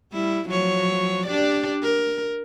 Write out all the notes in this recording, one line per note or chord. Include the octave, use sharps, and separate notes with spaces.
G3 E4
F3 F#3 C#5
D4 G4 D5
A#4